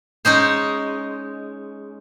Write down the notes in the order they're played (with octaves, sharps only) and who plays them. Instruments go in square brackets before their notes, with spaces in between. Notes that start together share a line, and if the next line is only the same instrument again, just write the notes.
[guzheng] G#3 C#4 D#4 C5